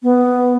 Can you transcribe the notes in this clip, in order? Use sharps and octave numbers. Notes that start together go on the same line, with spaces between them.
B3